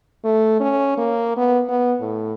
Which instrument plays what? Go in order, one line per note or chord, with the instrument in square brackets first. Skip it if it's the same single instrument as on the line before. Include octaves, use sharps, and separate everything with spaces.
[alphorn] A3
C#4
A#3
B3
B3
A2